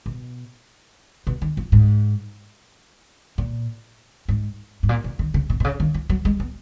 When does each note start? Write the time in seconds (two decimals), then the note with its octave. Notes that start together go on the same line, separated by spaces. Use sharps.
0.06 B2
1.27 B2
1.42 D#3
1.57 F3
1.72 G#2
3.38 A#2
4.28 G#2
4.83 G#2
4.89 A#2
5.04 B2
5.19 D#3
5.34 C#3
5.50 B2
5.60 B2
5.64 C#3
5.80 D#3
5.94 F3
6.09 F#3
6.25 G#3
6.40 B3